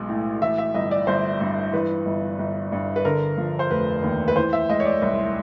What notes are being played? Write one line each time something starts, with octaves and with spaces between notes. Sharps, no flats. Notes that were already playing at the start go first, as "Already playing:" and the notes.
Already playing: B1 G#3
A2
E3 E5
E5
G1 D#5
D5
G1 C5
G2
E3 B4
G1
G1
G2
B4
D3 A#4
F3
C5
F1 B4
D#2
B4
E3 C5
E5
G#3 D#5
C#5
D5
C2